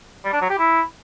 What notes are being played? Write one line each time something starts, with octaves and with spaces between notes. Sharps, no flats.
G3
D4
F#3
G4
E4